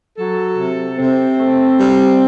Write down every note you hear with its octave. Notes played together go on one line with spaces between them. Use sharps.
F#3 A4
C3
C3 C4
A3
G3